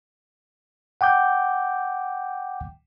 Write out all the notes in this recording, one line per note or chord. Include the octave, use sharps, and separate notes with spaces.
F#5 G5 D6 G6